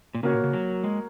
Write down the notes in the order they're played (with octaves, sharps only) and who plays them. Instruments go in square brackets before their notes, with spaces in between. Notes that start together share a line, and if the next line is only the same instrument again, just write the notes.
[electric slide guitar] A#2
[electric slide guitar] C#3 [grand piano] A#3 F#4 A#4 C#5
[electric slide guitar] A#2
C#3
F#3
G#3